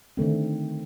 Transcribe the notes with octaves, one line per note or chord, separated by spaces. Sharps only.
D3 D#3 A3 C4